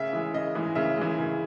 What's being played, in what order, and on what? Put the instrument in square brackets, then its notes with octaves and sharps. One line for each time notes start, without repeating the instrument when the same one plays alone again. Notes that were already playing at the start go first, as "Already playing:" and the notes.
Already playing: [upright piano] C#3 E5
E3 G#3
C#3 D#5
E3 G#3
C#3 E5
E3 G#3
C#3